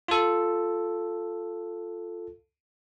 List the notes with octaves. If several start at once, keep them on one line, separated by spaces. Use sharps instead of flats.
F4 A4